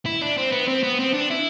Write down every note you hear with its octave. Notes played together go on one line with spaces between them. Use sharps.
E4
D4
C4
B3
C4
B3
C4
D4
E4